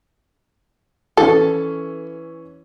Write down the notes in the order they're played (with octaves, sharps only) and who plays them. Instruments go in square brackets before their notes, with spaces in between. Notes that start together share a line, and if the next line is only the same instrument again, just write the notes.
[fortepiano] E3 C#4 [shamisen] A4